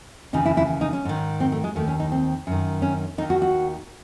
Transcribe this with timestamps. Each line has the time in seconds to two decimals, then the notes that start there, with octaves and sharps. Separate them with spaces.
0.33 D#2 C#3 E3 D#4
0.45 E4
0.57 E4
0.81 D#4
0.93 C#4
1.05 G#2 D#3
1.40 C4
1.52 A3
1.64 G#3
1.75 D#2 D#3 A3
1.88 C#4
2.00 D#4
2.12 C4
2.47 F#2 D#3
2.82 C#4
3.18 D#2 D#4
3.22 D#3
3.30 F#4
3.42 F#4